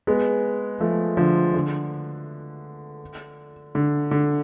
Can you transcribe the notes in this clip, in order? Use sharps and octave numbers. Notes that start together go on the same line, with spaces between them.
G#3 B3
F3 A3
D3 F3
D3
D3
D3